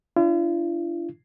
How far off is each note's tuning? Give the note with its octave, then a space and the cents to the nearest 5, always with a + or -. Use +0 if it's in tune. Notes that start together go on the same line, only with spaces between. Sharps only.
D4 +0 F4 -45